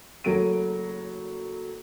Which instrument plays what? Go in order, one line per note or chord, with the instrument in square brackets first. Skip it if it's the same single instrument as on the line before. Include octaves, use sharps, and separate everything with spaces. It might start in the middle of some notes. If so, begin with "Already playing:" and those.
[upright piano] F#1 F#3 A3 A#4 D7 D#7